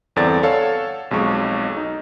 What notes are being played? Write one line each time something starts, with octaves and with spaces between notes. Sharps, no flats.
G1 E2 C4 A4 D5 A6
A4 C#5 F5 F#5 A5
B1 F2 G#3 C#6
D#4